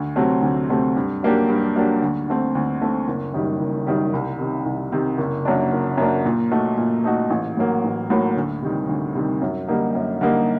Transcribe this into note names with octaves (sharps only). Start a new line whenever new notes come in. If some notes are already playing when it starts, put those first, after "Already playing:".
Already playing: D2
C3 F#3 A3 C4
D2
C3 F#3 A3 C4
G2
F#3 A#3 D4 G4
G2
F#3 A#3 D4 G4
D2
D3 A3 C4
D2
D3 A3 C4
F#1
F#2 D#3 G3
F#1
F#2 D#3 G3
C2
C3 D#3
C2
C3 D#3
F#1
F#2 F#3 A#3 D4
F#1
F#2 F#3 A#3 D4
A#2
A3 D#4 F#4
A#2
A3 D#4 F#4
A1
A2 F#3 A#3
A1
A2 F#3 A#3
D2
C3 D#3 G3
D2
C3 D#3 G3
F#2
D3 G3 A#3 D#4
F#2
D3 G3 A#3 D#4